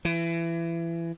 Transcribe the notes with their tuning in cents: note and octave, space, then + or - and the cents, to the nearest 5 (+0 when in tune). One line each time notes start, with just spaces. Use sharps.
E3 +25